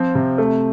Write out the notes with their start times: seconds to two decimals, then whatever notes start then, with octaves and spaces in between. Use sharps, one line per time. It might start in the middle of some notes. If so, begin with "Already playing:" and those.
Already playing: F3 C4
0.15 C3
0.38 A3